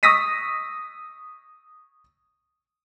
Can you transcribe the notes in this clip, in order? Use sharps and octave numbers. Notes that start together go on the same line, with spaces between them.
C#6 D#6 E6 A#6 B6 D#7